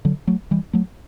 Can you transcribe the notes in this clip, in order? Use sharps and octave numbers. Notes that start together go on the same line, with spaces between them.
D3 F#3
F#3 A3
E3 G3
F#3 A3